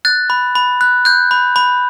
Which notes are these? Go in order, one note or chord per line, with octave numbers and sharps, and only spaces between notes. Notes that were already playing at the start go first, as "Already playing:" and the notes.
F#6 A6
B5
B5
F#6
F#6 G6
B5
B5